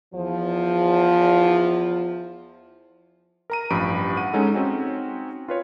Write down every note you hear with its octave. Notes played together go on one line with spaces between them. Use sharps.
E2 F3
A#4 A#5 D#7
A1 G2 F3 B5 D7
F#5 D#7
G#3 C#4 D#4 A4
C4 C#4 D#4 F#4
F4 B4 C#5